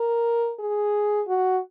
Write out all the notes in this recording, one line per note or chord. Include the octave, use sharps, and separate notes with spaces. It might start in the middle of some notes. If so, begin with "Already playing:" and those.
Already playing: A#4
G#4
F#4